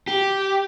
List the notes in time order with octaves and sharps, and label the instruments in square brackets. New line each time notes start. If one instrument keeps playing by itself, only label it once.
[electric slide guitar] G4